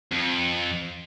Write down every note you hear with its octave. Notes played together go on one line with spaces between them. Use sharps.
F2